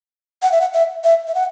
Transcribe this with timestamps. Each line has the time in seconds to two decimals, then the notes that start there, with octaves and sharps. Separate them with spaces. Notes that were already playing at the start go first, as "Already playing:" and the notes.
0.42 F#5
0.52 E5
0.61 F#5
0.73 E5
1.04 E5
1.27 E5
1.35 F#5